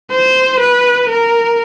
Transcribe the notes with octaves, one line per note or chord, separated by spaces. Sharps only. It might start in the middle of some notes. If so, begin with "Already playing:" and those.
C5
B4
A#4